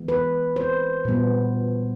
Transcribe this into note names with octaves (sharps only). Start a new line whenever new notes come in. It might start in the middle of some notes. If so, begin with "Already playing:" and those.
Already playing: E3 G#3 B3
B4
C5
A#2 G3 B3